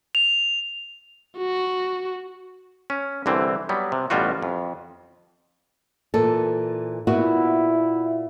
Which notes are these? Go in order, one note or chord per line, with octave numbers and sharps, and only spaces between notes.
F7
F#4
C#4
C2 D3 E3 C4
F#3 G3 B3
C3
A1 B2 G3 F4 F#4
F2
A#2 E3 A4
A#2 B3 E4 F#4